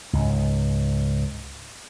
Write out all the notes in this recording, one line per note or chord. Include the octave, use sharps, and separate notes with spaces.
C#2 G#2